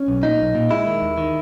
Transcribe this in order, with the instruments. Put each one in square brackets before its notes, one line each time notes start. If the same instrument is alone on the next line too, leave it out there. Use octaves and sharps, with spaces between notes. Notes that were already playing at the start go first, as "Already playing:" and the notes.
Already playing: [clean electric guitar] C#4
B1
A#2 D#4
B1
A#2
G#3 E4
D#3
D#2
D#3